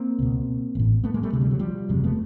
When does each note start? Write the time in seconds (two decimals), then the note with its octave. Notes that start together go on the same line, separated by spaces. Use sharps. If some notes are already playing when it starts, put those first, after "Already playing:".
Already playing: A#3 C4
0.19 C#2 B2
0.75 A1 A2
1.04 A3 B3
1.14 G#3 A#3
1.23 G3 A3
1.33 D2 C3 G#3
1.41 G3
1.51 F#3
1.59 F3 G3
1.89 F#1 E2 C3 F#3 G#3
2.04 A3 B3